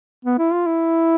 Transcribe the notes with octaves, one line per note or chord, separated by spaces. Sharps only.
B3
E4
F4
E4